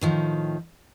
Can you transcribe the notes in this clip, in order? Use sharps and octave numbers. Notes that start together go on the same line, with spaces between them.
A2 D#3 F3